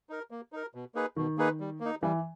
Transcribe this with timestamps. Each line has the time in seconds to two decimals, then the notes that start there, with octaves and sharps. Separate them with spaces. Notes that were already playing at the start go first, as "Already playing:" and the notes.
0.09 D#4 A#4
0.31 A#3
0.52 D#4 A#4
0.75 B2
0.95 A#3 D#4 G#4 B4
1.16 B2 D#3
1.38 A#3 D#4 G#4 B4
1.60 G3
1.80 A#3 D#4
2.02 E3 G3